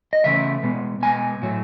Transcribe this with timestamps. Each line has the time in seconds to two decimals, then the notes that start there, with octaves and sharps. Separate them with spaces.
0.13 D#5
0.24 C#3 E3 A3 C#4 E5
0.63 B2 G#3 B3
1.02 B2 G#3 B3 G#5
1.42 A2 F#3 A3